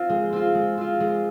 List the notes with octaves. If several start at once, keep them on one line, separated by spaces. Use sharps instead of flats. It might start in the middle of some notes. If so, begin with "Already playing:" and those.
Already playing: C4 F4
G#3
C4 F4
G#3
C4 F4
G#3